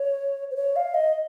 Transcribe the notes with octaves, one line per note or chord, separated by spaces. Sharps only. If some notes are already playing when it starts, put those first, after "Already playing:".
Already playing: C#5
C5
C#5
F5
D#5